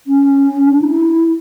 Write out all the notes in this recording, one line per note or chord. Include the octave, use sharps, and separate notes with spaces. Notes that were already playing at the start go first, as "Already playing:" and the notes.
C#4
D4
E4